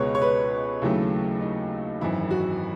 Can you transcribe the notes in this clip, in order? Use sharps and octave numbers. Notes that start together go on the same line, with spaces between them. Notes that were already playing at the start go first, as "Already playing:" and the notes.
Already playing: C#2 B2 G#3 B4 C#5
C#5
B4
D#2 C#3 F#3 A3 E4
D#4
G#1 F#2 E3 E4
F#4